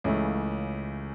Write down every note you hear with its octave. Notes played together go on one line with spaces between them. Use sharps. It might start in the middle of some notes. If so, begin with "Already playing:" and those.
C#2 C#3 E3 A3